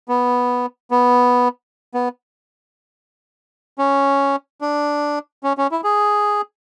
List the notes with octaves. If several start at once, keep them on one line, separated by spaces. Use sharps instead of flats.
B3
B3
B3
C#4
D4
C#4
C#4
E4
G#4